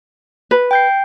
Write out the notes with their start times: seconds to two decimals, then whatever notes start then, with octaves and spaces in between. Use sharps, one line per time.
0.51 B4
0.71 G5 G6 C7